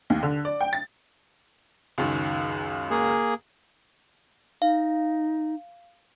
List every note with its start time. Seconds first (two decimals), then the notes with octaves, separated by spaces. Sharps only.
0.10 D#2
0.23 D3
0.45 D5
0.61 G5
0.73 A6
1.98 C#2 F#2 D#3
2.91 A#3 G#4
4.62 D#4 F5